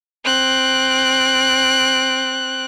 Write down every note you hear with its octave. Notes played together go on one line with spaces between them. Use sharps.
C4 F#6